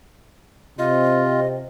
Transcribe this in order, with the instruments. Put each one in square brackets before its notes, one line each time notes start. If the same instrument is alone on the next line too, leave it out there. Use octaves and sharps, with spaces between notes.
[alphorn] C3 [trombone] C4 [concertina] F4 [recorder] D#5